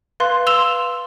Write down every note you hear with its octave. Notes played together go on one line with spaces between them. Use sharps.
B4 F5 C6
C6 E6 E7 F7 G7